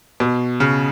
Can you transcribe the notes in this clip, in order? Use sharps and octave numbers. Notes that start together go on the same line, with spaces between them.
B2
C#3